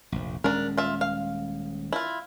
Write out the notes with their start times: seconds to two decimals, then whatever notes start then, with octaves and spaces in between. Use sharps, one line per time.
0.12 F1 A#1
0.44 D#1 G#3 C#4 D4 A#4
0.77 F4 E5
1.01 F5
1.93 E4 F4